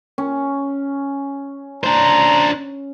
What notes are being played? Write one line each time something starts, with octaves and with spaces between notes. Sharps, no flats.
C#4
D4 C5 A#5